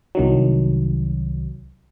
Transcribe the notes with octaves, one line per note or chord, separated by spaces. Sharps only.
C2 D#3 F#3